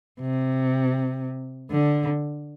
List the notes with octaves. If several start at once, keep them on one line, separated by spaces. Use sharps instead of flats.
C3
D3